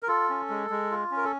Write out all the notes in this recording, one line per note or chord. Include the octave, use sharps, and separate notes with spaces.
A#4
F4 A4
C#4
G#3
G#3
F4
C#4
A#4
A4